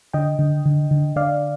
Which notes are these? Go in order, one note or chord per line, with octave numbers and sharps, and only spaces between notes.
D3 D#5 G5
D3
D3
D3
D3 D5 F5